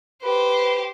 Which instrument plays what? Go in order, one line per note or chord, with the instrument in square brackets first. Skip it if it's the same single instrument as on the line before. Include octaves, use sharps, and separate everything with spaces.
[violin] G4 C5 [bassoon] B4